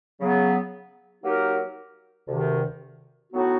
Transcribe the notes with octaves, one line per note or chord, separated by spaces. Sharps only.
C#3 F#3 B3
F#3 A#3 D#4 G4 A#4
D2 C3 D#3
A2 F#3 B3 D#4 F#4